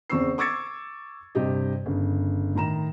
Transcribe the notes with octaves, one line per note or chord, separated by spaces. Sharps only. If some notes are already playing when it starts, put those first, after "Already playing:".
E2 C#3 C4 C#6 E6 C7
C#6 D6 E6 G#6 A6 C#7
G2 C3 G4 D#5
G1 C#3
A2 D#3 A#5 E7